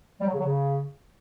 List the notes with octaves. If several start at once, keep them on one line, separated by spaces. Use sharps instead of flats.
G3
F#3
C#3
F#3
C#3